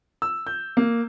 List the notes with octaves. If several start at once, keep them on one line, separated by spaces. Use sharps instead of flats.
E6
G6
A#3